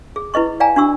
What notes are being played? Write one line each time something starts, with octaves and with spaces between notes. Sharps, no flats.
G#4
E4 B4 D#5 C#6
D5 F5 G5 G#5 A#5
D4 F#4 C#6 E6